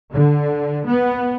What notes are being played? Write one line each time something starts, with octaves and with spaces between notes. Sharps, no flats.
D3
B3